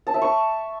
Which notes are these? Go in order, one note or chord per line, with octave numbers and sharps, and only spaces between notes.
A5
E5
C#6